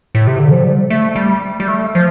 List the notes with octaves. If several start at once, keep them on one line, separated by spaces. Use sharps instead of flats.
A2
C3
D3
F3
G3
A3
G3
G3
A3
F3